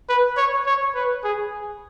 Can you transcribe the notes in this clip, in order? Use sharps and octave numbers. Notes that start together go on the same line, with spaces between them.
B4
C#5
C#5
B4
G#4